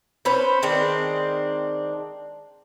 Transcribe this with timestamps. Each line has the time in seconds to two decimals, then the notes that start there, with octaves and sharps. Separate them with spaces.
0.25 C#4 B4 C5
0.62 D#3 G#3 C4 D4